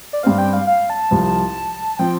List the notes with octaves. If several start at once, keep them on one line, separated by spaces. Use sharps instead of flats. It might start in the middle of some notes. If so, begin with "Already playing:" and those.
D5
G2 G3 C4 F5
G5
F5
F5
A5
C2 C3 F3
F3 C4 G5